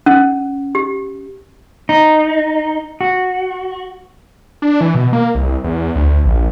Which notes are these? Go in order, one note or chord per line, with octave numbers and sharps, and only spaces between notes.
C#4
G4
D#4
F#4
D4
E3
B2
A#3
C2
E2
D2
A#1